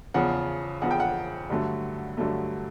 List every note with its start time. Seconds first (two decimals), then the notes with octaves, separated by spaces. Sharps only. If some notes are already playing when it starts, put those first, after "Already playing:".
0.14 E2 C#3 F3 F#5
0.82 E2 C#3 F3 F#5
0.91 G5
1.00 F#5
1.50 G2 D3 F#3 A3
2.17 G2 D3 F#3 A3